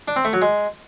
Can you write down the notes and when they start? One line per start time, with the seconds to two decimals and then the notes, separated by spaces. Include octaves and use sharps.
0.08 D4
0.16 C4
0.25 A3
0.33 F#3
0.42 G#3